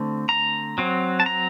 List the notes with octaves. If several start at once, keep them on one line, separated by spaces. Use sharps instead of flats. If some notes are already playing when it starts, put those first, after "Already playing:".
Already playing: D3 A3 C4
A#5
F#3 C4
A5
A#5